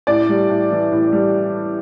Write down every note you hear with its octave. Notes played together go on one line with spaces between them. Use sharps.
A2 D5
G3
A2
E3
A2
G3